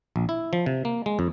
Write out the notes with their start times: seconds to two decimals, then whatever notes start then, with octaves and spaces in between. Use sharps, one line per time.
0.16 A#1
0.29 E4
0.53 F3
0.66 C3
0.85 A#3
1.06 G#3
1.19 F2